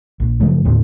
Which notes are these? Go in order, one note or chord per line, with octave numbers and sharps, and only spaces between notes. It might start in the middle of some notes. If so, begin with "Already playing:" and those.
A#1
F#2 C#3 F3 A3
D#2 A2 D3 C4